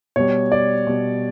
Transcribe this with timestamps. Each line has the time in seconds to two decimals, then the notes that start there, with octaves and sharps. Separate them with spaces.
0.16 B2 G3 C#5
0.52 D5
0.87 B2 G3